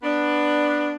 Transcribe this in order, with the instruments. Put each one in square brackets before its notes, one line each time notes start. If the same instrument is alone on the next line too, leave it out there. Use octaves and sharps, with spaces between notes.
[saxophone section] B3 D4